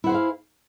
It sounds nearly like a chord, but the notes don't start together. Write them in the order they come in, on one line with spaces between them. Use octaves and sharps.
E4 F#5 C5 G#4 F5